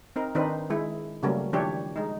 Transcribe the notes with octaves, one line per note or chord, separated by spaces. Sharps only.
C4 D#4 A#4
D#3 C4 D4 D#4 B4 C5
D#3 G#3 E4
C#3 F#3 G3 A3 A#3 C#4
D#3 F3 D4 E4 G4 C#5
G#3 D#4